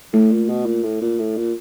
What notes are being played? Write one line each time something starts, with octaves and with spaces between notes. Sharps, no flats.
A2 A3
A#2
B2
A#2
A2
A#2
A2
A#2